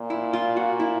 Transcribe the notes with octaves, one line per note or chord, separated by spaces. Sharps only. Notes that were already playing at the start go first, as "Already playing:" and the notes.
Already playing: A#2
E4
F4
F#4
E4